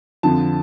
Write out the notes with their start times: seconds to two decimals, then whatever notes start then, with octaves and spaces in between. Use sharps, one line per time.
0.23 F2 D3 F3 A5